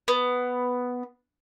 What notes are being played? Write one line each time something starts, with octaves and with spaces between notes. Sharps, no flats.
B3